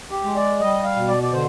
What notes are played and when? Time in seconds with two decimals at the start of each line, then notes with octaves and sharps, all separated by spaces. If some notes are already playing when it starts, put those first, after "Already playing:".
0.11 G4
0.24 G#3
0.36 D5
0.59 G3 D#5
0.84 F5
0.96 B2
1.08 D5
1.23 D5
1.33 D3 C5